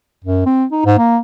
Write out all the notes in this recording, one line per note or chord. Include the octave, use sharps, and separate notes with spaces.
F#2
C4
D#4
G#2
A#3